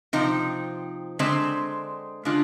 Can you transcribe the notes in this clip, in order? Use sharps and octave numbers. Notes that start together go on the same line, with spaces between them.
C3 F3 C4 D#4
D3 G#3 C4
D3 G#3 D4 F4